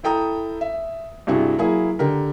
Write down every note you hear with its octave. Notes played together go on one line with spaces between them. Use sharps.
E4 A4 G5 A#5 D#6
E5
G2 C3 E4 F#4 G#4
F#3 A#3 E4 G#4
D3 G4 A#4